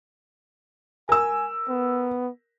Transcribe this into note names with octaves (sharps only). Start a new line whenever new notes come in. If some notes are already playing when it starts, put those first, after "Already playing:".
A#4 G#5 E6
B3